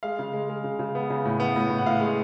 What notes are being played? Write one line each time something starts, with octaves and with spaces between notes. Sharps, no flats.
G#3 F5
C#3
G#3
G#3
C#3
C#3
B3
C#3
A2
B3
A2
A2
F#5
A2 F5
G#3